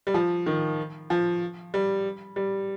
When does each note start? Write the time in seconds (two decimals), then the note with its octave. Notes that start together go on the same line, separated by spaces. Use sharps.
0.07 G3
0.14 F3
0.46 D#3
1.10 F3
1.74 G3
2.36 G3